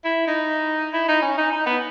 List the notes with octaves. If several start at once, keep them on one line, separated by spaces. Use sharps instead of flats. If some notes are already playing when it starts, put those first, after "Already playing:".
E4
D#4
E4
D#4
C#4
D#4
D#4
B3